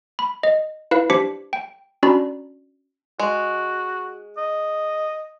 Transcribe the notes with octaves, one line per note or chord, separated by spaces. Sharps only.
B5
D#5
E4 B4 F5
D4 G4 C5 D6 B6 C#7
G5
C#4 D4 F#4 D5 A#5 B5
G#3 F#4
D#5